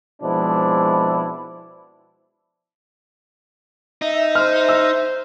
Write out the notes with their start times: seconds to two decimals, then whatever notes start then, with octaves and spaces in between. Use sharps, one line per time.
0.22 B2 F3 G#3 C4 D4 E4
4.02 D#4 E5
4.35 C5 F6
4.69 E6